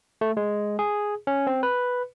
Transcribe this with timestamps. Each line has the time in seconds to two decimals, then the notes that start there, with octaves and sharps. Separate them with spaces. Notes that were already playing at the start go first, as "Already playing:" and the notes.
0.21 A3
0.37 G#3
0.79 G#4
1.27 C#4
1.47 C4
1.63 B4